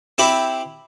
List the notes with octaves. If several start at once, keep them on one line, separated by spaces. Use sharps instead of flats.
C4 E4 G4 B5